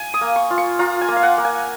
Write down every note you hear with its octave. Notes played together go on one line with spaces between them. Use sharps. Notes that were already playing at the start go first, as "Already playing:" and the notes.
Already playing: G#5
D#6
A#3
C#6
F4
C#6
F4 A#5
G#5
A#3
F5
F#5
A#3
G#5